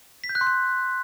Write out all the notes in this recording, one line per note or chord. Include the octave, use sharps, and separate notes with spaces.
B6
G6
F#6
C6
F#6